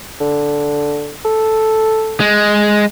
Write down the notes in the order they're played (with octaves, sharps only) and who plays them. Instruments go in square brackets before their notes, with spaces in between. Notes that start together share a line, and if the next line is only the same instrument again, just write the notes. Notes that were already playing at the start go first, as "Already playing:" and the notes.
[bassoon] D3
A4
[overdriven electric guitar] G#3